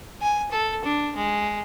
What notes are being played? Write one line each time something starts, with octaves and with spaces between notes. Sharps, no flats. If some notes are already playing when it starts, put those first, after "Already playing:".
G#5
A4
D4
G#3